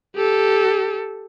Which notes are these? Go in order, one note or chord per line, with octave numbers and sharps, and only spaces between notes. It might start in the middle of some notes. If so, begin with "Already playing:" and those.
G4 A4